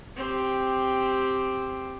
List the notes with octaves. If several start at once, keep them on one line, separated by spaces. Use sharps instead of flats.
C4 G4